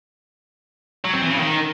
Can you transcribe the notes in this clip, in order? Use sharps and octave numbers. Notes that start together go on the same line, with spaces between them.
F#3
C4
E3
C#3
D#3